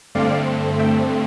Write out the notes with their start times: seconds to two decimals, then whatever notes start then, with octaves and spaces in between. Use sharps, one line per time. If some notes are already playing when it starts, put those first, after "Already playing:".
0.15 G2 D3 A3 C4 D5 F5
0.79 E5 G5